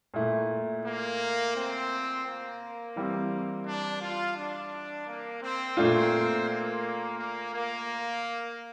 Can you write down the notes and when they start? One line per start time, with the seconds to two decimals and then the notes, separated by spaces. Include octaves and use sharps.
0.14 A#2 A3 E4
0.84 A#3
1.55 C4
2.25 A#3
2.96 E3 G3 C4
3.66 D4
4.01 F4
4.36 D4
5.07 A#3
5.42 C4
5.77 A#2 A3 C4 D4 F4
6.47 A#3
7.18 A#3
7.53 A#3